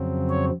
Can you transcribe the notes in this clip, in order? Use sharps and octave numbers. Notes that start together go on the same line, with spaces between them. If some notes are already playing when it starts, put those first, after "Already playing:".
Already playing: F2 C#3 F#3 C4
C#5